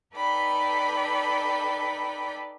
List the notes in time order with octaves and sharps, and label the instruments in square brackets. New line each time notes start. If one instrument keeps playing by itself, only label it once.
[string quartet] D#4 A4 B4 D5 G5 B5